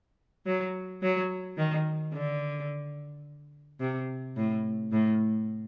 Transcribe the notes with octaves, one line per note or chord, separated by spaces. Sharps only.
F#3
F#3
D#3
D3
C3
A2
A2